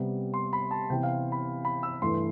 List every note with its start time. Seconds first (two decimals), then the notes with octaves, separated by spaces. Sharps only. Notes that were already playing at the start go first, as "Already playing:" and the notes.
Already playing: C3 G3 B3
0.34 C6
0.53 B5
0.71 A5
0.90 C3 E3 B3 G5
1.03 F5
1.32 B5
1.65 B5
1.83 E6
2.02 G2 E3 A3 C6